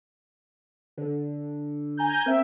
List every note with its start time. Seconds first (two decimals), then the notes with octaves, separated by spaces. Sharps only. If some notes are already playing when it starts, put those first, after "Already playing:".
0.98 D3
1.97 G#5 A#5 G6
2.26 C4 A#4 E5 G5